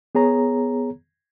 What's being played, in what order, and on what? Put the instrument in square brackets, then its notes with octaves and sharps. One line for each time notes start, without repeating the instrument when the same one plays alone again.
[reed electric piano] B3 G#4 C#5 A#5